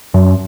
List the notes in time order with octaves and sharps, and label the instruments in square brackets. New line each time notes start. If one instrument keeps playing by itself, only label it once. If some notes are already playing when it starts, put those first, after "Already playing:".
[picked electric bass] F#2